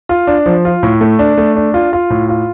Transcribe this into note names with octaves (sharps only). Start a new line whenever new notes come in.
F4
D4
F3
F4
A2
A3
D4
A3
D4
F4
F4
A2
F4